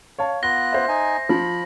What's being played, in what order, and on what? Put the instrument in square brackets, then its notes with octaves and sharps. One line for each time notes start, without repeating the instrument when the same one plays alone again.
[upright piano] C#5 F5 A5
[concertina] B3 F4 F#6 [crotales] A#6 [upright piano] G7
[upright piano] C5 E5
[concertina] D#4 G#5
[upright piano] F3 [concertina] B5